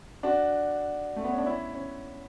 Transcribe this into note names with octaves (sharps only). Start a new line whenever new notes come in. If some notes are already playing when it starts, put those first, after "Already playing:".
D4 F#4
A3
B3
C#4
D4
C#4 E4
C#4